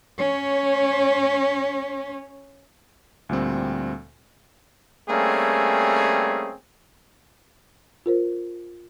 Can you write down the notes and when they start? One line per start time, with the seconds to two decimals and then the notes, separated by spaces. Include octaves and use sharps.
0.18 C#4 C#5
3.29 D2 A#2 G3 C4
5.09 G3 A3 A#3 C4 C#4 G#4
8.06 F4 A#4 C5